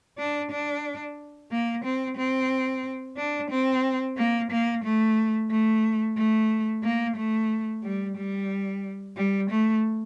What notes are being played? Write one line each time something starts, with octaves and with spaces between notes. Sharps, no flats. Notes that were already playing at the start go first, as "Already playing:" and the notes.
D4
D4
A#3
C4
C4
D4
C4
A#3
A#3
A3
A3
A3
A#3
A3
G3
G3
G3
A3